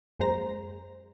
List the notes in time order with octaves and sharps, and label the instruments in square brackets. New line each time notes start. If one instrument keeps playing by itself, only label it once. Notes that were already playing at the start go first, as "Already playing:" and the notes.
[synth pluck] F#2 G#3 A#3 C5 A#5 A#6